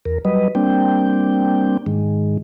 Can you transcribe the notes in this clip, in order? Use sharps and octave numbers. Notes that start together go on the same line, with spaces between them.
E2 A#4
F#3 G3 B4 D#5
G3 A#3 C4 D4 G5
G#2 D#3 G#3